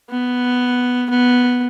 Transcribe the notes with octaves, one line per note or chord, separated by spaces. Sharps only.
B3
B3